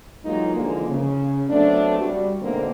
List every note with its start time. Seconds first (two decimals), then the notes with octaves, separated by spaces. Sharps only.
0.25 E3 F#3 G#3 A#3 D#4 F4
0.54 D3 E3 F3 G#3 A#3 D#4
0.89 C#3
1.50 F#3 A3 B3 C4 D4
1.99 G3 F#4
2.41 G#2 B2 D3 A3 A#3 C4